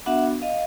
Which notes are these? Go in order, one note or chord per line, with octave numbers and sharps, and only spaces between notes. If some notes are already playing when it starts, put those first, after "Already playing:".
B3 D4 F#4 E5 F#5
D#5 F5